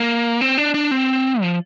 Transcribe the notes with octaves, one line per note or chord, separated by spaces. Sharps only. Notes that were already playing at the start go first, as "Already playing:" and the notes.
Already playing: A#3
C4
D4
D4
C4
F3